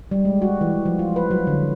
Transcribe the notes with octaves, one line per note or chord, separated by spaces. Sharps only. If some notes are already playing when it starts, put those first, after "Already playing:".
G3
G#3
F#4
E3
F3
F4
B4
F#3
D3